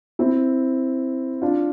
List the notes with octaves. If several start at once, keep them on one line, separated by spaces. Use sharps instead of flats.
C4 E4
D4 F4